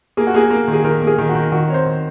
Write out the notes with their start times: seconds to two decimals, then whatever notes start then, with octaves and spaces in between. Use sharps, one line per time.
0.17 A#3 G#4
0.27 F#4
0.34 A#3 G#4
0.50 A#3
0.68 D#3
0.73 G#4
0.84 D#3 A#4
1.01 A#3
1.07 G#4
1.18 D#3
1.29 F#4
1.35 D#3
1.52 D#3 F#4
1.68 C4 C#5
1.74 C5
1.86 D#3